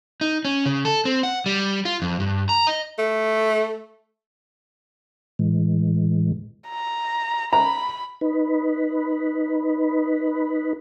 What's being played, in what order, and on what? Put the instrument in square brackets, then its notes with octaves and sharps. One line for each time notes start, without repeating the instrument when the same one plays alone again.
[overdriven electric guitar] D#4
C#4
C#3
A4
C4
F#5
G3
F4
F2
G2
A#5
D#5
[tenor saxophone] A3
[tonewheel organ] A2 E3 G#3
[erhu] A#5
[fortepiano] A#5 [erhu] B5
[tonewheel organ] D#4 B4